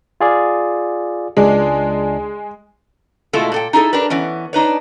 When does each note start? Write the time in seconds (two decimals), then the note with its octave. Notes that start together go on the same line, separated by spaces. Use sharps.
0.21 F4 G#4 D5
1.37 C#2 G#3 D4
3.33 B2 G#3 A3 E4 F4 A4
3.52 A#2 A4 G5
3.73 D#4 E4 G#4 A4
3.93 D4 G4 A#4 B4
4.10 E3 B3 C#4
4.53 D4 D#4 B4 C#5